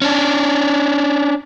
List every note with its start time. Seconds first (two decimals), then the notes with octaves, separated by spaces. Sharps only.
0.02 C#4 D4